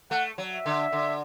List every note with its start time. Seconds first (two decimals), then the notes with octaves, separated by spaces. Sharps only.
0.11 A3 F#5
0.38 F#3
0.53 E5
0.66 D3
0.92 D3